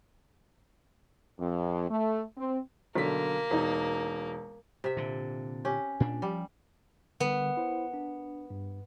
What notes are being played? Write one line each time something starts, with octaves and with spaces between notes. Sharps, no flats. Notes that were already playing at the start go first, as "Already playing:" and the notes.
F2
A3
C4
B1 D3 A#3 B6
E1 D#4
C3 E5
A#2 D3
C#4 G4
A#2 D4
F3 G3
D3 G3 B3
E4 C5
D4
G2